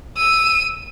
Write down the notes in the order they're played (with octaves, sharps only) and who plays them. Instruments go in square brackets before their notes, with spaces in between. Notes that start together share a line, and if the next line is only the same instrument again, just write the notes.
[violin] E6 D#7